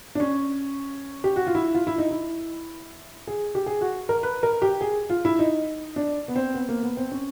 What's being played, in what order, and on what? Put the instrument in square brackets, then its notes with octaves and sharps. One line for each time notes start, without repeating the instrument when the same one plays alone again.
[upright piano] D4
C#4
G4
F#4
F4
E4
F4
E4
D#4
E4
G#4
G4
G#4
F#4
A#4
B4
A#4
G4
G#4
F4
E4
D#4
D4
B3
C4
B3
A#3
B3
C4
C#4